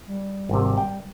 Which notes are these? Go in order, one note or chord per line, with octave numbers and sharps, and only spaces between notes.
G3
G#1 C3
G5